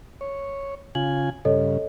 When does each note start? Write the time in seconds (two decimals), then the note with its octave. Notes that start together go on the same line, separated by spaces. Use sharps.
0.21 C#5
0.95 C#3 F4 G#5 F#7
1.45 G2 C#3 A4 C#5 D#5